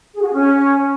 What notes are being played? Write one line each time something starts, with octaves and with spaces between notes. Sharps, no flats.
G#4
F#4
G#4
C#4